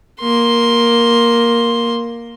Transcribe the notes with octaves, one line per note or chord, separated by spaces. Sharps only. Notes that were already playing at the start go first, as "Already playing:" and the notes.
A#3 C6